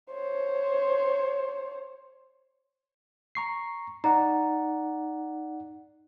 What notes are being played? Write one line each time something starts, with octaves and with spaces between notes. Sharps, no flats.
C5 C#5
A#5 C#6 C7
D#4 D5 F#5 A#5